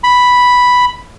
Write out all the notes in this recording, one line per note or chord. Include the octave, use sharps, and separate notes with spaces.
B5